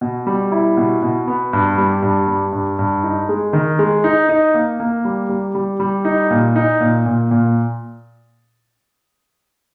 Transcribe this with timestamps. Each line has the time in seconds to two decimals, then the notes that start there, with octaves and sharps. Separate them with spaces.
0.01 B2
0.27 G3
0.52 E4
0.77 B2
1.03 B2
1.28 B3
1.53 G2
1.78 G3
2.03 G2
2.27 G3
2.52 G2
2.79 G2
3.03 D#4
3.29 G#3
3.53 D#3
3.79 G#3
4.04 D#4
4.29 D#4
4.54 A#3
4.80 A#3
5.05 G3
5.29 G3
5.55 G3
5.80 G3
6.05 D#4
6.30 A#2
6.56 D#4
6.80 A#2
7.06 A#2
7.31 A#2